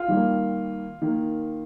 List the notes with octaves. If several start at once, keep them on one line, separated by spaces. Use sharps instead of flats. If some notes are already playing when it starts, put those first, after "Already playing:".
Already playing: F4
D#3 G3 A#3
D#3 A#3